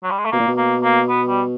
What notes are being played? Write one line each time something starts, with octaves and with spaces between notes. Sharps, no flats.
F#3
G3
G#3
A3
B2 A#3
A#2
B2
A#3
A#3
B3
G3